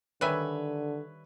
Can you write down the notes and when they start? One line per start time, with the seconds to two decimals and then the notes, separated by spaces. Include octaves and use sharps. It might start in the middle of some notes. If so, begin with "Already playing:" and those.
0.21 D3 D#3 G3 B4 C#5 E5 G#5